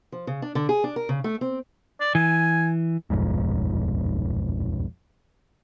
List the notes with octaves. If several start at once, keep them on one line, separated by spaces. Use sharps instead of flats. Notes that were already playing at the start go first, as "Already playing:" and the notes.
F3
C#3
D4
D3
G#4
D4
A#4
C#3
A3
C4
D5
E3 G#5
D#1 B1 F2 G#2